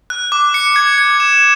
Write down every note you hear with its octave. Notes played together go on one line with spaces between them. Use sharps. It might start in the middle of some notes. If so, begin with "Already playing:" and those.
F#6
D6
C#7
G#6
G#6
E7